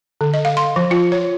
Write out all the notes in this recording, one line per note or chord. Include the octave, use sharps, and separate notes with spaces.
D3
D#5
F5
C6
F3
F4
C#5